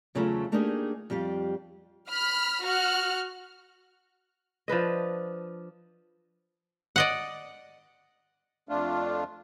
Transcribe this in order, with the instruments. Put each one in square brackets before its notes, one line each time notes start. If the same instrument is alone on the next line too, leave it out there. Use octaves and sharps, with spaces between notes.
[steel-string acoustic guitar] E2 C#3 F#3 A3 F4 A4
A3 A#3 D4 D#4 G4 G#4
F2 G3 G4 F5
[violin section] B5 F6 B6
F#4 F6 F#6
[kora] F3 D4 B4 D#5
[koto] D5 D#5 F#5
[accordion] F2 A3 D4 F4